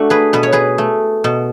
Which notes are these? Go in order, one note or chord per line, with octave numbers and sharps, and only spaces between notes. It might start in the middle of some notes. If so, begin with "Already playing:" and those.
Already playing: A3 D4 F#4
G#4 B4
B2 B4
C#5
G#4 B4
A3
B2